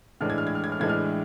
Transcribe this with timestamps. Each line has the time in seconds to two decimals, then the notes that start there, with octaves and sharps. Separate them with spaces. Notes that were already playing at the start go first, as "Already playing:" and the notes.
0.21 A2 E3 G#3 D4 F6
0.30 G#6
0.38 F6
0.47 G#6
0.55 F6
0.64 G#6
0.72 F6
0.80 A2 E3 G#3 D4 G#6
0.89 F6